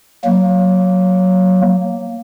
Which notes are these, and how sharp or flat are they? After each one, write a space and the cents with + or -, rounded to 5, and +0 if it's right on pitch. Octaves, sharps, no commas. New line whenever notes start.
F#3 +0 A#3 +0